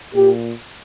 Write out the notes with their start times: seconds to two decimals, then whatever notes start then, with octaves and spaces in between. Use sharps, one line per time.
0.14 A#2 G4